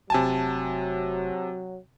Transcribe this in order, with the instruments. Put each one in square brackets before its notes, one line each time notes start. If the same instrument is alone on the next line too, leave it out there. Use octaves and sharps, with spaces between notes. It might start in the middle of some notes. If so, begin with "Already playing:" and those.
[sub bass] F1 [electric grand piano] C3 G#5 A5 [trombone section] F#3